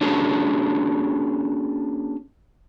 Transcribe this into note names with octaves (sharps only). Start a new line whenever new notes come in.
A#3 C#4 D4 F#4 G#4 A4